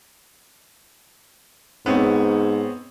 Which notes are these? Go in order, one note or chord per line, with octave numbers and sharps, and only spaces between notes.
G#2 B3 C4 C#5